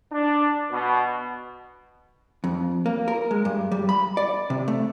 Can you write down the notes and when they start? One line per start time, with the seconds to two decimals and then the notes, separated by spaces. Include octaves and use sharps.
0.12 D4
0.71 B2
2.44 F2
2.86 A#3
3.08 A#4
3.31 G#3
3.45 G2
3.72 G3
3.89 B5
4.17 D5
4.50 C3
4.68 A3